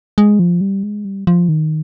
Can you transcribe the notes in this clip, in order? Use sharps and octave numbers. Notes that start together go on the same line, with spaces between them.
G#3
F3
G3
G#3
G3
F3
D#3